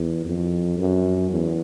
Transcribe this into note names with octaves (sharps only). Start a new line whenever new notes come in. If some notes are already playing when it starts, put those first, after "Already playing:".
Already playing: E2
F2
F#2
E2